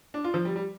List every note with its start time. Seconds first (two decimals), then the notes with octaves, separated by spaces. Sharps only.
0.14 D4
0.24 F4
0.34 F3
0.45 G3
0.56 G3